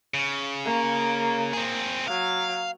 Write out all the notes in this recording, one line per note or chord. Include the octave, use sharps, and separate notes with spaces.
C#3
A#3
C4 G#4
F#3 F5